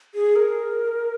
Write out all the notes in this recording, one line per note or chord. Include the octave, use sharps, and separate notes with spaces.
G#4
A#4